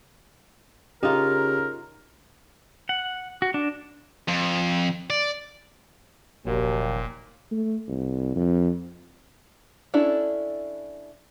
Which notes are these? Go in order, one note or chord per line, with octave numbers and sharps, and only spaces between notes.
C#3 D#4 F4 G4 A#4
F#5
F#4
D4
F2
D5
F1 A#1 D#2 A#2 F#3
A3
C2
F2
C#4 D4 E4 A4